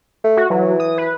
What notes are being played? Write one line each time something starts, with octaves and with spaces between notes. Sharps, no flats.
A3
F#4
E3 F#3
D#6
B4